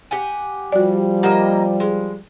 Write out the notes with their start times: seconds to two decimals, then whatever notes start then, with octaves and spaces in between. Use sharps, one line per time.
0.11 G4 F#5 G#5
0.72 F3 G3 F#4 D5
1.23 A#3 G4 D#5 F#5
1.80 G#3